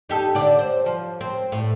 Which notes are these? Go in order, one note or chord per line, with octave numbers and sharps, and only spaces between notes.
D#4 G4 A4
D3 D5
C5
F3
C4
A2